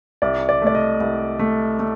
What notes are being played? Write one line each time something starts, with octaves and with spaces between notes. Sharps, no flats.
C2 D5
D5
A3 D5
D#5
C2
A3
A3